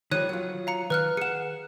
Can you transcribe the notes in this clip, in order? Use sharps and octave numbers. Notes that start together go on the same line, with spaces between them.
D#3 F3 G3 C#5 F#6 D#7
F#3 F4
F5 A#5 C#7
D#3 B4 F6 F#6
G#4 F#5 C#7 E7